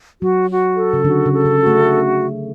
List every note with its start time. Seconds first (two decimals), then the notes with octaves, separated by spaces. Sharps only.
0.22 F#3 F#4
0.50 F#4
0.77 A4
0.93 C#3
1.04 D3 F#4
1.25 C#3
1.33 A4
1.46 C#3
1.60 F#4
1.67 A3